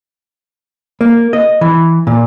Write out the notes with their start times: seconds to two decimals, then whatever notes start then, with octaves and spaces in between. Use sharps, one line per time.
1.01 A#3
1.33 D#5
1.61 E3
2.07 A#2